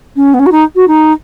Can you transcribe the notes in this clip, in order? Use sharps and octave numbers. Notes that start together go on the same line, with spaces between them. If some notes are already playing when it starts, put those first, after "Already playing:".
C#4
B3
C#4
F#4
D#4
F#4
D#4